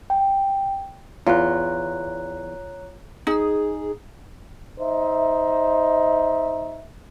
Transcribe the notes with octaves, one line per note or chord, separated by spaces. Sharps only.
G5
E2 F4 C#5 A#5 F#6
D#4 G#4
D#4 C5 D#5 E5